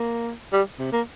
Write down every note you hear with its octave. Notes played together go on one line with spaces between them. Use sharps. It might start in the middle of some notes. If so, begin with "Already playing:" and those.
Already playing: A#3
G3
C3
A#3